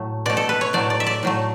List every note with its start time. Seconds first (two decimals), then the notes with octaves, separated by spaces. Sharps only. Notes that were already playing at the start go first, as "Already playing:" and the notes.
Already playing: A2 F#3 A3
0.26 B2 A3 D5
0.37 A4
0.49 B4
0.61 C#5
0.73 A2 F#3 A3 D5
0.90 D5
1.00 E5
1.06 D5
1.23 A2 F#3 A3